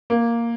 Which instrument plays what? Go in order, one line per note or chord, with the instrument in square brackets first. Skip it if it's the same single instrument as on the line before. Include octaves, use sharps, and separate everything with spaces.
[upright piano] A#3